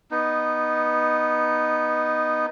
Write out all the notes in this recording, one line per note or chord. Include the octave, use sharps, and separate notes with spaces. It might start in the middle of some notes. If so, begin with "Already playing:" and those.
B3 D#4